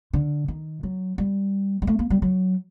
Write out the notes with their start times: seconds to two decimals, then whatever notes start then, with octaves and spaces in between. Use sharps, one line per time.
0.13 D3
0.48 D#3
0.83 F#3
1.18 G3
1.82 G3
1.87 A3
1.99 A#3
2.10 G3
2.22 F#3